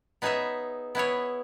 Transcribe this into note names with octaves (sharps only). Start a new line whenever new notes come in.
B3 D#4 G#4 C#5 E5
B3 E4 G#4 C#5